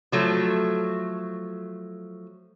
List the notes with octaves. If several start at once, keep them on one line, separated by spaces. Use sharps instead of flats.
F3 F#3 A3